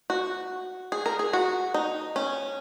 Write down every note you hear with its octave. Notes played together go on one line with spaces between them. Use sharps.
F#4
G#4
A#4
G#4
F#4
D#4
C#4